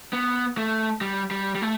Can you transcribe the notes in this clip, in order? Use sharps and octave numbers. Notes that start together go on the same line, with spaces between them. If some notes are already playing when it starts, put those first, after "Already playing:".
B3
A3
G3
G3
G3
A3